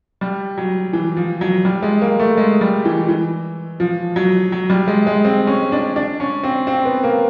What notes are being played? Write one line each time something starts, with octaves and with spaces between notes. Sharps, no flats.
G3
F#3
E3
F3
F#3
G3
G#3
A#3
A3
G#3
G3
E3
E3
F3
F#3
F#3
G3
G#3
G#3
C4
C#4
D4
D4
C#4
C4
C4
B3
A#3